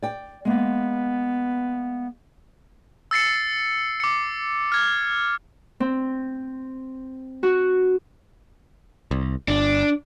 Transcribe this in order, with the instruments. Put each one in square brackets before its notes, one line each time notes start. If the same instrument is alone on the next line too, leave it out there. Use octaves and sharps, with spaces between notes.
[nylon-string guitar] D5 G5
[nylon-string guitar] G#3 A#3 [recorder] B3
[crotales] E6 A6 C7 C#7
D6 C#7
F6 G#6
[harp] C4
F#4
[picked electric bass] C2
[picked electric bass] G1 [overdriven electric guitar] D4